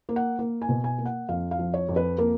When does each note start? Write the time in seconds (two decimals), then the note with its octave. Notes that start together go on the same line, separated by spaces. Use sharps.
0.09 A#3
0.16 F#5
0.39 A#3
0.62 G#5
0.69 B2
0.84 G#5
0.98 A#3
1.05 F#5
1.29 F2 F5
1.51 F5
1.59 F3
1.74 C#5
1.89 F2
1.96 B4
2.18 A#3 A#4